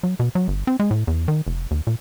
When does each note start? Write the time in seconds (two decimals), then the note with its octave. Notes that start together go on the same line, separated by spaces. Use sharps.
0.03 F#3
0.20 B2
0.35 F#3
0.48 G1
0.67 C4
0.80 G#3
0.91 A2
1.07 E2
1.28 D#3
1.47 F1
1.71 D#2
1.87 A#2